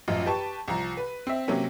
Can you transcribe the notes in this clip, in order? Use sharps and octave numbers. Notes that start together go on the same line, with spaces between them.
A1 F#2 F3 F4 D#5
G4 B4 A5 C#6
C2 F3 A#5
B4
C4 E5
C3 F#3 A#3 C#4